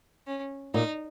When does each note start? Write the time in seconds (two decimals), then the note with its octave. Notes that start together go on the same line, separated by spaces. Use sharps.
0.27 C#4
0.74 A#2 D#4